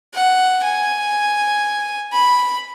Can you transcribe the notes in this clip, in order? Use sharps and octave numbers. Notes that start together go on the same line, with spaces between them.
F#5
G#5
B5